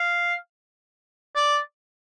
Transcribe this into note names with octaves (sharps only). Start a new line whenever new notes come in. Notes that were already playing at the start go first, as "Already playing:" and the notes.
Already playing: F5
D5